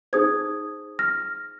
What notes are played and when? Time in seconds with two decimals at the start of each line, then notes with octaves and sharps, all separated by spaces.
0.13 D#4 G#4 C5 D#6 G#6
0.99 F6 A#6